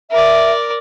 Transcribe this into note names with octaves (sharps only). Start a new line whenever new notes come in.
A#4 D5 E5